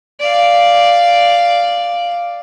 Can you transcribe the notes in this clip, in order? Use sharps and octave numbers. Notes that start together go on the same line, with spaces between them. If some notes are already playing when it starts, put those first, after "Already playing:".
D5 F5